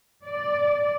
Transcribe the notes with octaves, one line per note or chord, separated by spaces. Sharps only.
D5